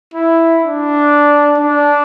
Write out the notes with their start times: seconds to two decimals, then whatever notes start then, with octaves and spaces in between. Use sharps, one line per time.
0.14 E4
0.62 D4
1.58 D4